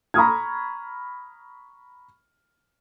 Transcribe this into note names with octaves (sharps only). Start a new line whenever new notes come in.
A#5 B5 C#6 D#6 F6 G#6